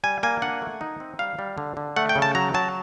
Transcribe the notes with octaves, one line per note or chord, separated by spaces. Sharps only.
G3 G#5
A#3 G#5
D4 F#5
A3
D#4
C4
G3 F5
G3
D3
D3
A3 F#5
G5
C#3
A5
F#3 A#5
F#3 A5